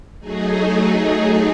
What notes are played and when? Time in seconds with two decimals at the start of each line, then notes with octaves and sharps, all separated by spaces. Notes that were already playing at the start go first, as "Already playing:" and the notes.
0.19 F#3 A3 D#4 G#4